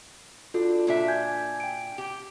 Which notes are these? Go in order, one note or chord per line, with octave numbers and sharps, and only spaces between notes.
D4 F4 F#4 A4
A#2 D4 E5
G#5 G6 G#6
G5 D7
G4